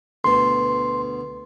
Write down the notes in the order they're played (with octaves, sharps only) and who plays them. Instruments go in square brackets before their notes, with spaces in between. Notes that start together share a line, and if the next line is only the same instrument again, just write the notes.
[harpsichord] D2 B2 [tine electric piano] C6